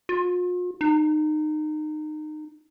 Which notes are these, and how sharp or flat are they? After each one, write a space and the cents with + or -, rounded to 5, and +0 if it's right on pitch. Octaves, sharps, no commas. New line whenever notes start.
F4 +45
D#4 -25